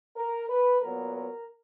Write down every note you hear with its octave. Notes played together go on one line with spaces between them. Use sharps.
A#4
B4
A#2 F#3 B3 A#4
A#4